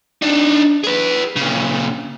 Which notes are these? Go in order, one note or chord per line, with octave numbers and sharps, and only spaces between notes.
D4 D#4
G#4 B4
A#2 C#3